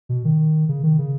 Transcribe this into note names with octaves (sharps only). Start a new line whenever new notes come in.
B2
D#3
C#3
D#3
C#3